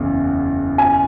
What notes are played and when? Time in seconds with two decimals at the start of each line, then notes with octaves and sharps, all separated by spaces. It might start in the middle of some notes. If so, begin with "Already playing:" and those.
Already playing: F#1 E2 C#3
0.78 G#5